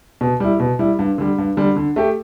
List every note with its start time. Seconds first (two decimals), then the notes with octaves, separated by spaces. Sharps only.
0.21 B2
0.40 G3 E4
0.60 B2
0.79 G3 E4
0.99 G2
1.18 D3 G3
1.38 G2
1.57 D3 G3
1.76 D3
1.96 A3 G4